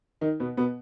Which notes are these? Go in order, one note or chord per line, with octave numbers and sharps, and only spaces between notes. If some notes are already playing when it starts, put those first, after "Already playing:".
D#3 D#4
B2 B3
B2 B3